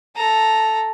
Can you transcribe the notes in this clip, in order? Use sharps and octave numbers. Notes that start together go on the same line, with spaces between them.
A4 A#5